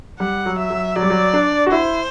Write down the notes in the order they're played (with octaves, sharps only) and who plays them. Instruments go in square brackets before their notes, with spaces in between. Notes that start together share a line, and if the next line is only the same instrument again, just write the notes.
[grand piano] G3 [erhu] F#5
[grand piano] F#3
[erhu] E5
[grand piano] F#3
[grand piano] F#3 [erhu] D5
[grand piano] G3
F#3
D4
F#4
[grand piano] E4 [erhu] C5